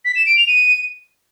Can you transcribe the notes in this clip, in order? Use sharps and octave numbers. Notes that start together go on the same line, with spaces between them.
B6
E7
D7
F7
D#7